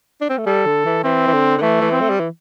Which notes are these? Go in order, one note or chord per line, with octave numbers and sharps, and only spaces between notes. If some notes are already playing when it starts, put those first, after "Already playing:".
D4
C4
A3
G3 A4
D3
E3
E3 C4
E3
D3
D3
E3 A3
E3
C4
A3
G3
E3